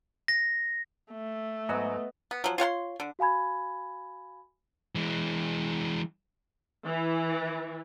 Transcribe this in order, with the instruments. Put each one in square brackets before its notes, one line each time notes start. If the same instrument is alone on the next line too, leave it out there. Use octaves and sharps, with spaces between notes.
[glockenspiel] A#6
[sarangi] A3
[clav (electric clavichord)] G#2 F#3 F#4 [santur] B3 D#5
[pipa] B3
F3 F#3
F4 C#5 F#5 C6
D3
[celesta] F#4 F5 G#5 B5 G#6
[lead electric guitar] E3 G#3
[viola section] E3